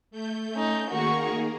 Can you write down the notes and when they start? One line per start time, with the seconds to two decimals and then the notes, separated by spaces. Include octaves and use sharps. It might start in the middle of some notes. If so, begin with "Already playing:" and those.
0.11 A3 G6
0.54 C#4 D#4
0.90 D#3 A#3 F#4 G#4 A#4 C#6